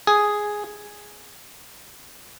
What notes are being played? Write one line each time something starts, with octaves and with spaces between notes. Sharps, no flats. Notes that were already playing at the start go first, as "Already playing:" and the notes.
G#4